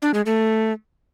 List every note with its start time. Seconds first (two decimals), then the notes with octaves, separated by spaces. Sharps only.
0.02 D4
0.14 G#3
0.26 A3